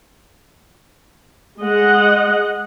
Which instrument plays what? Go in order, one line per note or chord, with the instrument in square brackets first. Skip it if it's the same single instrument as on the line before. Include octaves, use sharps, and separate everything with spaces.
[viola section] G#3 D#5 F#5